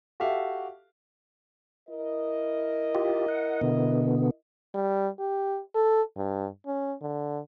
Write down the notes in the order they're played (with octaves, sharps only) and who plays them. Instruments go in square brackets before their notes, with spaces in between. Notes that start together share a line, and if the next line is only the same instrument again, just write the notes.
[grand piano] F#4 G4 A4 E5 F5
[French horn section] E4 A#4 D#5
[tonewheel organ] F4 G4
F#5
B2 D3 B3
[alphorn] G3
G4
A4
G2
C#4
D3